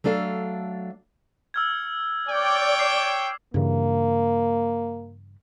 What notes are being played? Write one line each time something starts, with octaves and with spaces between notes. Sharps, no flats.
F#3 A3 D4 A4 F5
E6 F6 G#6
C#5 D5 G5
D6 C7
G2 C#3 E3 A#3